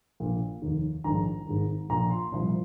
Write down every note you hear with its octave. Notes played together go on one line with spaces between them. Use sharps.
A#1 A#2 F3
F1 D#2 D#3
A#1 G#2 D#3 A#5
G#1 G#2 D#3
A#1 A#2 F3 A#5
C6
C2 A#2 F3